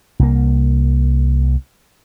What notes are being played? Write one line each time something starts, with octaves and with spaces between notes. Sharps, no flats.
C2 A#3